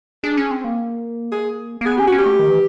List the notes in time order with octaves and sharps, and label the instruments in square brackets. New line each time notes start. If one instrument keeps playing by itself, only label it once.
[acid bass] D4 [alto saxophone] G#4
[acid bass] C#4
C4
A#3
[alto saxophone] G#4
[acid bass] A#3
[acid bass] B3 [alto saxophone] G#4
[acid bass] C#4 [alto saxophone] G4
[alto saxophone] F#4
[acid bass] C#4
[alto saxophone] G4
[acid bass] A3
D#3
E3